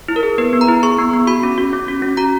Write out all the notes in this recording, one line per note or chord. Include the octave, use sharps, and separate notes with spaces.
E4
A#4
G#4
B3 B4
B3
A#5
E4
G#4 C#6
B3
B3
F#4 B5
C#4
F#4
C#4
F#4
C#4
F#4 A#5